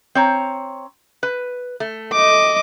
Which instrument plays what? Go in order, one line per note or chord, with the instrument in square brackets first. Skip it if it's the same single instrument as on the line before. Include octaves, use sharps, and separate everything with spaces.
[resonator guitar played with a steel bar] C4 C#5 A#5
B4
A3
[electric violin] D#5 D6